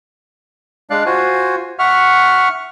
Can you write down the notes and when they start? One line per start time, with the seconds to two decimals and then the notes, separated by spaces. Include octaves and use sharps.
0.90 G#3 D4 D5 F5 F#6
1.06 F4 F#4 C5 G#5
1.79 E5 F#5 C#6 F6